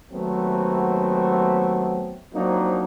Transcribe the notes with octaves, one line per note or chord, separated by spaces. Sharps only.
D#2 F#3 A3 B3 C4
F3 F#3 A#3 C4 D4 D#4